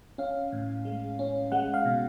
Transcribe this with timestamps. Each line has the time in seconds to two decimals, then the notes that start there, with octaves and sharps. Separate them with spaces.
0.18 C#4 F5
0.52 A2
0.85 G#3
1.19 C#4
1.52 G#3 F#5
1.74 F5
1.85 B2